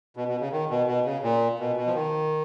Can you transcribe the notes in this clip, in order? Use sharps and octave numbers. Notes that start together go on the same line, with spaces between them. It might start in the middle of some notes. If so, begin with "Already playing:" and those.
B2
B2
C#3
D#3
B2
B2
C#3
A#2
B2
B2
F3
D#3